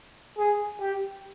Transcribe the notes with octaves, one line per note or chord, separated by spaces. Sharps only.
G#4
G4